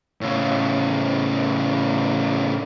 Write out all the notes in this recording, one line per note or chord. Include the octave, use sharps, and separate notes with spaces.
A2 C#3